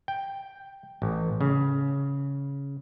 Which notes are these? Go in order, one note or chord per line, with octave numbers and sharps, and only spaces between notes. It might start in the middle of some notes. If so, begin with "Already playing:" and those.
G5
A1
C#3